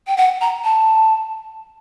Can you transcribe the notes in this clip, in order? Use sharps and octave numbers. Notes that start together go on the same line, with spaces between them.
G5
F#5
A#5
A5